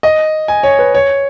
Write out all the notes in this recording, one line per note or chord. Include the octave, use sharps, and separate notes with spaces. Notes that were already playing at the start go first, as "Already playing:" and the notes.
D#5
G#5
C#5
B4
C#5